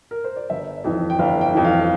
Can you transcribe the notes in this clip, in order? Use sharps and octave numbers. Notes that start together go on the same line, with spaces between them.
A#4
C5
D5
G1 E5
F2 E3
G5
G1 F5
G5
F2 E3
F5